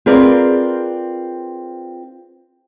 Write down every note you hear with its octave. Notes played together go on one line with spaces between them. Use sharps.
C4 F4 G#4 A#4 B4 D5